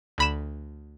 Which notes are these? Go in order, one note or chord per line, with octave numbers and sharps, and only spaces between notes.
D2 B5 E7